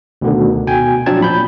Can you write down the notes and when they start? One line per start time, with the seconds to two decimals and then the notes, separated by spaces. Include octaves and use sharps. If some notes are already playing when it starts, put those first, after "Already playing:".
0.21 D2 B2 D3 D#3
0.67 B2 G5 G#5
1.06 F3 F#3 C4 D4 A5 G#6
1.21 A#2 B5 G6